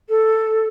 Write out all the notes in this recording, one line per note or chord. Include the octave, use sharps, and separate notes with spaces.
A4